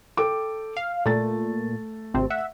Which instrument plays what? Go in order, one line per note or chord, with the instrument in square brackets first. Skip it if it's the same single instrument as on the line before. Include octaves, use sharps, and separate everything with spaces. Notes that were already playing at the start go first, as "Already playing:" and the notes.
[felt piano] A4 G5 D6
[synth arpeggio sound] F5
[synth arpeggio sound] A#2 [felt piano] A3 A6
[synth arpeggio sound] G#1 C3 C4
E5 F#5